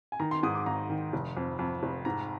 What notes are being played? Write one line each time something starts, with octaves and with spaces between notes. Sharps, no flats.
G#5
D#3 A#5
C6
G#2 D#6
D6
G#1 A#5
D#3
F1
F2
F2
F1
G#2 A#5